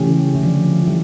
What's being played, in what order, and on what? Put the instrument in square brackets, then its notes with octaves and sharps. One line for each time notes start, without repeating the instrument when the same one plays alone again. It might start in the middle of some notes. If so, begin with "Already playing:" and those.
Already playing: [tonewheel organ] C#3 E3 [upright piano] A3 C#4 G4
[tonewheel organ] D3 F3
E3 G3